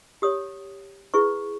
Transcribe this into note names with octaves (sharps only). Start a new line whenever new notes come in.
G4 C#5 D#6
E4 G#4 B4 C#6